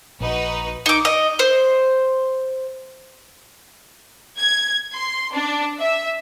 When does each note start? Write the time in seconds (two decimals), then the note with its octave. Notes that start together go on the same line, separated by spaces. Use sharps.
0.21 A#1 D#4 F#4 B4
0.86 D#4 D6
1.05 D#5
1.39 C5
4.38 G#6
4.94 C6
5.33 D4
5.79 E5